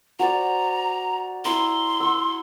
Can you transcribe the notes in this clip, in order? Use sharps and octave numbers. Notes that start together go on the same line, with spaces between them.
F#4 C5 D5 A#5
E4 A#5 C6
F#5 E6